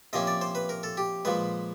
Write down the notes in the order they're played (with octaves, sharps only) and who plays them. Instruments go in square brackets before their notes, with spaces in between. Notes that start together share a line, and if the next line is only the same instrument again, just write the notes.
[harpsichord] C3 F3 A#3 C#4 D#5
D5
C5
B4
A#4
A4
G4
A#2 F3 G#3 B4